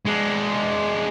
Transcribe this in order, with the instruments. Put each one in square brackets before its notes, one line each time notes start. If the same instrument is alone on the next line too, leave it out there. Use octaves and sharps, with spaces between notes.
[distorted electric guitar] G#3 D4